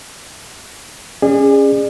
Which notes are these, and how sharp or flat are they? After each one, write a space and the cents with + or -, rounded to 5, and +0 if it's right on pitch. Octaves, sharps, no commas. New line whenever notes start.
C#4 +0 G#4 -20 D5 +30